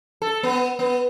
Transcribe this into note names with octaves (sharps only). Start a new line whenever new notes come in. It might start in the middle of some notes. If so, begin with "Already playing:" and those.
A4
B3
B3